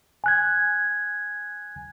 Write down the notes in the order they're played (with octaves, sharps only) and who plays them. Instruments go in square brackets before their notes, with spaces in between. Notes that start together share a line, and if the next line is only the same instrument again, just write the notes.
[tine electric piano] G#5 F#6 G#6